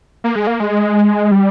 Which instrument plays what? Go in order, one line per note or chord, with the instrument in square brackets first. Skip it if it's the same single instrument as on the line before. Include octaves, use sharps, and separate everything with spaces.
[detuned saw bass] A#3
G#3
A#3
G#3
G3